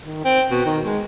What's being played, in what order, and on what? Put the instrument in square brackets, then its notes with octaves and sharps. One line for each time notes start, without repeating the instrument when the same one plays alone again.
[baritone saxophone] D#3
C4
B2
D#3
G#3